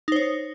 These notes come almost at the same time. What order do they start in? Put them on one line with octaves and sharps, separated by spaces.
D#4 C5 C#5